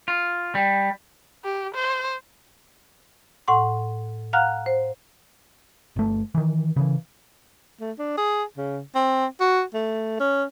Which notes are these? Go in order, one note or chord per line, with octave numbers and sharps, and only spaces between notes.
F4
G3
G4
C5
A2 F#5 C6
F5 F#5 A#5 F6 F#6
C5
G1 A3
D#3 E3
C#3 E3
A3
D4
G#4
C#3
C4
F#4
A3
C#4